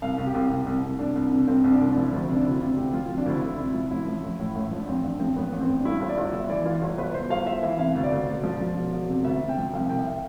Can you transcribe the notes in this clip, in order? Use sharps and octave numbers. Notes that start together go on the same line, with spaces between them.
C2 F5
C2
G4
C2
C2
C2
C2
C2 D4
C2
C3
C2 C4
C2
D4
C2
D4
F3 E4
D2
C3
D4
D2 E4
C3 F4
D2 G4
F3 F4
C3 F4
D4
D2 E4
D2 E4
C3 E4
F3 F4
A1 E4
F3
A1
A2
A1
F3
D4
A1 C4
A1 D4
F3 C4
A1 B3
A1
C4
A1
D4
G2 E4
G1
D5
G1
G1 E5
E3 D5
E3 F4
G1
G1 B4
G1 C5
G1 F5
G1 E5
E3 E5
C3 F5
D2
D5
D2
E1
F3
F3
E1
E1
C3
D2 E5
C3
G5
F3
C2 F5
C2 G5
E5
F5